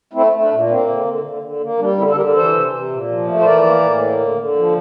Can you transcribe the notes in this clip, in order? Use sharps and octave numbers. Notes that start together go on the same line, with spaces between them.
A3 C4 E4
A3
D4
A#2
A#3 C4
D3
D3
D3
D3
A#3
G3 D4
D3 C4 E4
A4
D3 G4 A#4
E3 A4 C5
C3
C3
A#2
F3
A3
C5
E3 A#4 D5
A#3
A2
A#3
D3
D3
F3